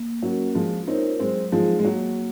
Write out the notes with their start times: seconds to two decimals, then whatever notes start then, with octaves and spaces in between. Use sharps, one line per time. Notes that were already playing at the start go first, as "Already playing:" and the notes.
Already playing: A#3
0.22 F#3 C#4 F#4 A#4
0.55 F3 G#3 F4
0.87 C4 D#4 A#4 C#5
1.20 F#3 G#3 C4
1.52 F3 G#3 C4 D#4 G#4
1.79 G#3
1.84 F#3 A#3